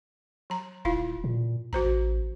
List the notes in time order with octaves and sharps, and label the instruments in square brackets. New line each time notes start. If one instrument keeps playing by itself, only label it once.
[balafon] F#3 A#5
[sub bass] D#1 [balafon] E4 F4 F5
[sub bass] A#2
[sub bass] A1 [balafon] F#4 C5 A#5